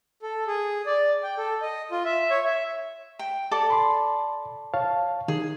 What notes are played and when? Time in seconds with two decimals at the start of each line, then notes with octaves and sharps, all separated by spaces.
0.22 A4
0.47 G#4
0.86 D5
1.23 G5
1.37 A4
1.62 D#5
1.92 F4
2.05 E5
2.31 C#5
2.45 E5
3.19 G5
3.51 A4 D5 D6
3.70 B5 C6
4.74 C#5 F5 A5
5.28 D#3 G#4